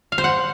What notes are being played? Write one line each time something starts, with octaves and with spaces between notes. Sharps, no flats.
F5
C5
F#5